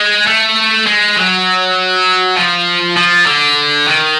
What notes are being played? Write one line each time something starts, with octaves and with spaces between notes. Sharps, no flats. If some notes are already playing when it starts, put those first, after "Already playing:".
Already playing: G#3
A3
G#3
F#3
F3
F3
D3
D#3